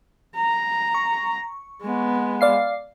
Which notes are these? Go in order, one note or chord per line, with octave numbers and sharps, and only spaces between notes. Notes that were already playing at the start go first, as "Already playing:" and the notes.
A#5
C#6
G#3 B3
D5 F5 C7